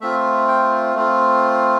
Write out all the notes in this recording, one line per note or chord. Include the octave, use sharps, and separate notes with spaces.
A3 C4 F4 E5
G5
A3 C4 F4